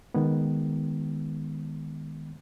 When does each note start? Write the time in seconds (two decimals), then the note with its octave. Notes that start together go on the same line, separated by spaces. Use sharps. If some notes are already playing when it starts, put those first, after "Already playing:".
0.14 D#3 G#3 B3